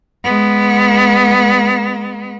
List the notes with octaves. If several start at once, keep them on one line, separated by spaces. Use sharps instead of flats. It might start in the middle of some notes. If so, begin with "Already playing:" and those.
G#3 B3